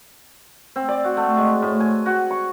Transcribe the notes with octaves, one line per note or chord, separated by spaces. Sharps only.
C4
D5
F#4
A3
G#3
A2
G#5
F#4
C#6